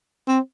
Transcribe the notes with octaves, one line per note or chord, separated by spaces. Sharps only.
C4